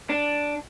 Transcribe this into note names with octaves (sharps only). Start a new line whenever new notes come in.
D4